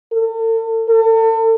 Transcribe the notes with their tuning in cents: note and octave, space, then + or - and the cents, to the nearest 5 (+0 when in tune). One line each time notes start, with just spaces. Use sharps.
A4 +40
A4 +35